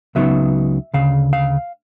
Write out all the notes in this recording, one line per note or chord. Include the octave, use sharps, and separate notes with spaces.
C#2 C#3 F#3 B3 D#4 E5
D2 C#3 F5
F5